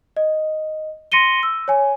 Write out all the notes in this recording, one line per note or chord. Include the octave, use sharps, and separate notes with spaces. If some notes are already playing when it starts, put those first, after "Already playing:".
D#5
C6 A#6 C#7 D#7 G7
E6
C#5 G#5